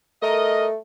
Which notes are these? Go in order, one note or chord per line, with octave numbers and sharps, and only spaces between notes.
A3 A#4 D#5